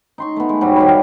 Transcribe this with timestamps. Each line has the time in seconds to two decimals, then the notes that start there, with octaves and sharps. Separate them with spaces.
0.18 D#4 C6 C#6
0.36 A3 B3
0.49 G#3
0.61 G#2 F#3 G3 F#4
0.76 D#3 G3 F5 B5
0.89 F5